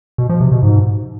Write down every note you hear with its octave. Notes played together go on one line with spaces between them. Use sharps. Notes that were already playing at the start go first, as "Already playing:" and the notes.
B2
F3
C3
B2
G#2